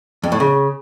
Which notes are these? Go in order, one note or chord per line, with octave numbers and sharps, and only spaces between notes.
F2
A2
C#3